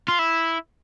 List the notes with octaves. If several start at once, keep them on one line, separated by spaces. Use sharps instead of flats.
F4
E4